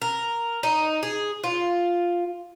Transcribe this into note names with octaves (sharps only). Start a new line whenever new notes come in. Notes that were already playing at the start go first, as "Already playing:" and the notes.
A#4
D#4
G#4
F4